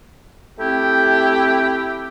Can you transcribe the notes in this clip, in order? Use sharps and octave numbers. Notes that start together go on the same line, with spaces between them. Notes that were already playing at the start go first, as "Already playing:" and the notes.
A3 C4 E4 G4